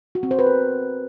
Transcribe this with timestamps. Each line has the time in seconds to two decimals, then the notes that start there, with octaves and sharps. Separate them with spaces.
0.15 F#4
0.23 C4
0.31 C5
0.39 B4
0.47 A#4